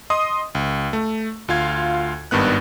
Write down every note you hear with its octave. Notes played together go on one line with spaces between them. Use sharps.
D#5 C6 D#6
C#2
A3
D2 F4 F5 G#6
G#1 G2 D#3 B3 F#6